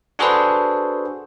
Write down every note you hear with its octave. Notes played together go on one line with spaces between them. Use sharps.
D4 F#4 G#4 A4 B4 C5